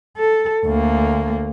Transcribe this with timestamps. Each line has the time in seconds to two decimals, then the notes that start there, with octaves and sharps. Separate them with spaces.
0.17 A4
0.65 D2 A#3